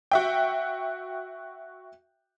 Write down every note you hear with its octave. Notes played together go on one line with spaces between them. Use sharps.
F#4 E5 G5